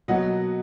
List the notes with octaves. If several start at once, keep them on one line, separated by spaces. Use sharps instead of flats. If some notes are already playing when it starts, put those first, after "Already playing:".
B2 F#3 A#3 D#5 F#5